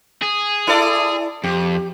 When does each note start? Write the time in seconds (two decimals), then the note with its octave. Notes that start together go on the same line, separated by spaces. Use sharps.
0.23 G#4
0.67 E4 A4 D5
1.44 F2 G4